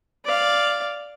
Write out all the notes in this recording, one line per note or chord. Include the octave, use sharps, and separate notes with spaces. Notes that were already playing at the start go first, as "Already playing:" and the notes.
D5 F5